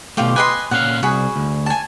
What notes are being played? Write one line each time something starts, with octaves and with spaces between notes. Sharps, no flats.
B2 A3 F4 G4
B4 D#5 G#5 C6
A#2 C#4 F5 F#5
C2 F#4 G#4 B5
D2
G#5 A5